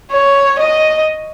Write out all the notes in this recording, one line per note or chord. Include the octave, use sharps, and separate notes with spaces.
C#5
D#5